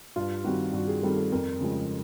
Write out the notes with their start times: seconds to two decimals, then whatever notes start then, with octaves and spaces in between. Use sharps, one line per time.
0.16 G2 F4
0.44 D#3 G3 C4 F#4
0.73 G2 F#4
0.88 G#4
1.03 D#3 G3 C4 A4
1.17 A4
1.32 F2 A#4
1.60 C#3 F3 G#3